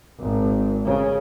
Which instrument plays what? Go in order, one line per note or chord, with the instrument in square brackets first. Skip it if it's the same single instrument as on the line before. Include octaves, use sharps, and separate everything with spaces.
[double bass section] G#1
C#3